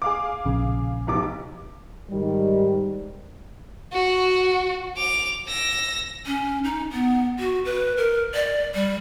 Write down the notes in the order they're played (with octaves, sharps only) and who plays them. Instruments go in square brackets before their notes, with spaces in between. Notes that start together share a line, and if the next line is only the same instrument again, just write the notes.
[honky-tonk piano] G#4 F5 D6
[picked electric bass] A#1 C#3
[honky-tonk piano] F1 B1 D6
[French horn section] G#2 D#3 G3
[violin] F#4
D6 F7
E6 A#6
[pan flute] C#4
D#4
B3
F#4
B4
A#4
D5
G3